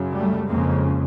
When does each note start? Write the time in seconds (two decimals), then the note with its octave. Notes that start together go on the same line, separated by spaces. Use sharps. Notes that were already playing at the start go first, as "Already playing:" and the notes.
Already playing: F#2 C#3
0.15 G3 A3
0.49 F2 C#3 G#3 A#3